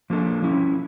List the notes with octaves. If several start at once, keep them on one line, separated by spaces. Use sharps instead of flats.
F3 A#3 D4 A4
F3 C#4 E4